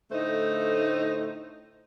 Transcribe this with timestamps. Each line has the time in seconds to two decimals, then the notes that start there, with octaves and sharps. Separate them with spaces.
0.12 A2 D3 A3 D#4 C5